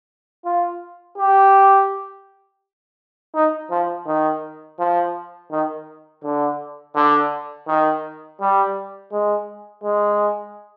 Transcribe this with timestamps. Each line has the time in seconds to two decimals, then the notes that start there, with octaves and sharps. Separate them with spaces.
0.45 F4
1.18 G4
3.34 D#4
3.71 F3
4.07 D#3
4.79 F3
5.51 D#3
6.23 D3
6.95 D3
7.67 D#3
8.40 G3
9.12 G#3
9.84 G#3